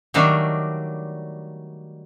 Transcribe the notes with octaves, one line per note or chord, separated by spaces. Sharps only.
D#3 F#3 G3 A3 D4